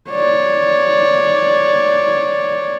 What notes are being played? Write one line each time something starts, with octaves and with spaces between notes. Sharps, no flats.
C#5 D5